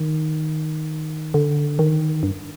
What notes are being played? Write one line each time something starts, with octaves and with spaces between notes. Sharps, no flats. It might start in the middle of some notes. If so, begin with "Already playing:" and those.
Already playing: D#3
D3
D#3
G2